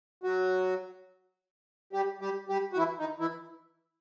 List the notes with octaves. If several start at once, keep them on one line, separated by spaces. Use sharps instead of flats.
F#3 F#4
G3 G4
G3 G4
G3 G4
F#4
E3 E4
D#3 D#4
E3 E4